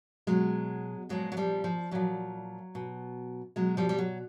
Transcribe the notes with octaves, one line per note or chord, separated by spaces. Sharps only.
B2 F#3 G#3
A#2 F3 F#3 G#3
F#3
F3 G3
F3
A#2 F3 F#3
B2
B2 F#3 G#3
F3 G3
G3
F#3